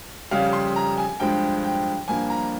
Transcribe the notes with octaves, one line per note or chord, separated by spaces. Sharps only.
F2 C#3 G3 F5
C6
A#5
G#5
G2 F3 G#3 G5
G5
G2 F3 A#3 G#5
A#5